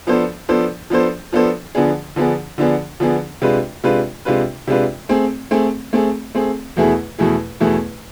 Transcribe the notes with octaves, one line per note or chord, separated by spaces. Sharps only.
F3 B3 D4 A4 C5
F3 B3 D4 A4 C5
F3 B3 D4 A4 C5
F3 B3 D4 A4 C5
D3 F3 B3 D4 G#4
D3 F3 B3 D4 G#4
D3 F3 B3 D4 G#4
D3 F3 B3 D4 G#4
C3 G#3 D4 F4 B4
C3 G#3 D4 F4 B4
C3 G#3 D4 F4 B4
C3 G#3 D4 F4 B4
A3 C4 G#4
A3 C4 G#4
A3 C4 G#4
A3 C4 G#4
E2 B2 A3 E4 G#4
E2 B2 A3 E4 G#4
E2 B2 A3 E4 G#4